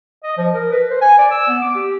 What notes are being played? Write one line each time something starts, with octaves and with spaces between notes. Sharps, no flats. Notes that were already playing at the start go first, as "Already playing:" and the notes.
D#5
F3
A#4
B4
C5
G#5
D5
E6
B3
D6
G4